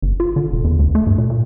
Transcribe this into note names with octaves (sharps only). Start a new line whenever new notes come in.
G1
F4
D3
E1
E2
D2
A3
G2
A#2
A#2